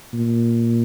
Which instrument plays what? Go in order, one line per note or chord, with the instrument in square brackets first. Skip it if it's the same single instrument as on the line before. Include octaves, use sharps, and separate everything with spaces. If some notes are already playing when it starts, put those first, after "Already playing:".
[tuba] A#2